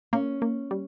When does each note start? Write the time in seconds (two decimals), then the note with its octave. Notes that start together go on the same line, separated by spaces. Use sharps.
0.13 A#3 C#4
0.42 A#3
0.71 G3